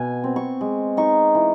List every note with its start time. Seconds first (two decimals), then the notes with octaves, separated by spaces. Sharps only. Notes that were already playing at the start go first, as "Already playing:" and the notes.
Already playing: B2 G#5
0.24 C4
0.36 C#6
0.61 G#3
0.97 D#4 C#6
1.35 E3